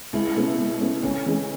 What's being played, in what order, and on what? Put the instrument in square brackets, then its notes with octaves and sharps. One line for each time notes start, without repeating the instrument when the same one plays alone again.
[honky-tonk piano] C#2 [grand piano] E4
[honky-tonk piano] B2 A3 C#4
C#2
B2 A3 C#4
[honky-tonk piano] D2 [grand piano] C#4
[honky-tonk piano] C#3 E3 G#3